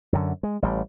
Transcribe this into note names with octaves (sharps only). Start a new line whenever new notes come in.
F#2 D3
G#3
A1 G3